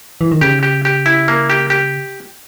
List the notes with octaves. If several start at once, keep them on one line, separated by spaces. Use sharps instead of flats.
E3
D#3
C#3 G4
G4
G4
E4
A#3
G4
G4